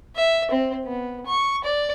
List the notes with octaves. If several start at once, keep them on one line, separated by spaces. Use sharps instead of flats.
E5
C4
B3
C#6
D5